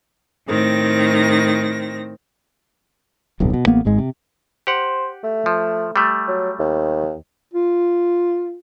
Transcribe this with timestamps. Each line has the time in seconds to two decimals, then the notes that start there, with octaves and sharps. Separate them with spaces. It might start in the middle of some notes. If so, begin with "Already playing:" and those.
0.48 A2 D#3 C4 A#6
3.40 D1 B1 G2
3.53 B2
3.66 A1 A#3 B3
3.85 G#1 G#2 G#3
3.98 C3
4.67 G4 C5 F#5
5.24 A3
5.46 F3
5.96 G3 A3
6.28 F#3
6.59 D#2
7.53 F4